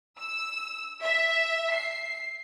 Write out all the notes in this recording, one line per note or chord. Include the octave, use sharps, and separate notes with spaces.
E6
E5
C7